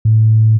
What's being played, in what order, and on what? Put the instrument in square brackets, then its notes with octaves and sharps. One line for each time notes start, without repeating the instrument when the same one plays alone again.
[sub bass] A2